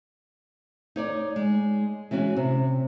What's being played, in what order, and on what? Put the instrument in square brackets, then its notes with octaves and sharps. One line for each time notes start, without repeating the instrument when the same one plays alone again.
[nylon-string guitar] D#4 C#5 D5
G#3
E3 G#3 C#4 F#4
C3